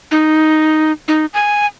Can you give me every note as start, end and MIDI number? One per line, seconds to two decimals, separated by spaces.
0.11 0.92 63
1.08 1.26 63
1.34 1.66 80